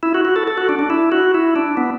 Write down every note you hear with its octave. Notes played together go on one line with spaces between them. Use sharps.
E4
F#4
F#4
A4
A4
F#4
D4
D4
E4
F#4
E4
D4
B3